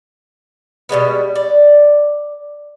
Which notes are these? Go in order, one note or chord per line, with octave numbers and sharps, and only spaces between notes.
B2 G3 G#3 B3
D5